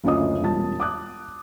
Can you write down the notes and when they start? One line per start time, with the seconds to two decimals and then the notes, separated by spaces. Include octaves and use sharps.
0.04 F#1 D2 C#4 F4 D#5 D#6
0.42 E1 G3 F4 A5 A6
0.80 D6 D#6 F#6